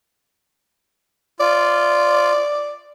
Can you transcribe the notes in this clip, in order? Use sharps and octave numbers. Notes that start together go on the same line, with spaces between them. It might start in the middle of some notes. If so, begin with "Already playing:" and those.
F4 D5